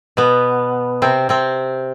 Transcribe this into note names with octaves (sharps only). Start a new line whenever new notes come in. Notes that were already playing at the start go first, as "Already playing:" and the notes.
B2 B3
C3 C4
C3 C4